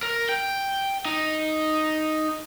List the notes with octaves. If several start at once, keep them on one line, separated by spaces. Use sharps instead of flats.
A#4
G5
D#4